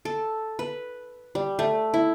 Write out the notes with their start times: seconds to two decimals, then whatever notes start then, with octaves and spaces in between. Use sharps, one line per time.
0.05 A4
0.59 B4
1.35 G3
1.59 A3
1.94 E4